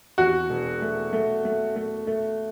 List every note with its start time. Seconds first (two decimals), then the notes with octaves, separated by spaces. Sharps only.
0.18 E2 F#4
0.50 E1
0.82 A3
1.13 A3
1.45 A3
1.76 A3
2.07 A3